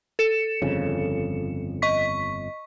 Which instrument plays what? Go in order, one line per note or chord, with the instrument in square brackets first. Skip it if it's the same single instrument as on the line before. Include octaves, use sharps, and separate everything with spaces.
[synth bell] A4 C#7 E7
[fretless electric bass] G1 F2 C#3
[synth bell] D#5 C#6 B6